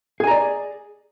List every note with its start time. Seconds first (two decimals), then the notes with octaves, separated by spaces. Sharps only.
0.20 G#4
0.24 G#5
0.27 A#5
0.31 D5